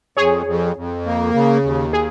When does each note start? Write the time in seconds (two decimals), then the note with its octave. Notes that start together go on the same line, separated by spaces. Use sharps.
0.17 F2 G#4 C#5
0.46 F2
0.76 F2
1.06 A#3
1.34 C#3
1.64 D#2
1.93 G#4